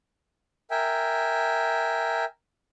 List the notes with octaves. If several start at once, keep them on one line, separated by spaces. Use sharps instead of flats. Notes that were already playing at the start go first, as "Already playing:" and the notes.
A#4 E5 G5 G#5